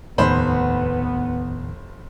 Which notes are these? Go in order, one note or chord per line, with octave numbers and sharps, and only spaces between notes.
F1 D#2 A2 D#3 B3 C5 B5